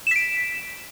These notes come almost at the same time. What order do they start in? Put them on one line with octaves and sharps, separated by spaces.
E7 B6 D7